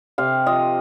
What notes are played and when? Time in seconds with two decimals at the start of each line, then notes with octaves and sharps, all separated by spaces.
0.18 C3 F5
0.47 F3 D#5